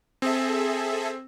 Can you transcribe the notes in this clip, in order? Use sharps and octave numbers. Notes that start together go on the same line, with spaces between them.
C4 G#4 A4 E5